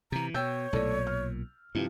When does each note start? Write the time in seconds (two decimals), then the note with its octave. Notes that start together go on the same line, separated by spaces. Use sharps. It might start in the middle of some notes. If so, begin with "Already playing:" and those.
0.12 C3 E3 A#5
0.34 B2 C#5 G5 E6 G6
0.73 B1 A#2 A3 A4 D5
1.07 F6
1.75 G2 C3 E3 F3